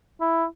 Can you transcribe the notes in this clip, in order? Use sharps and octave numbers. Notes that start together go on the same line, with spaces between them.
E4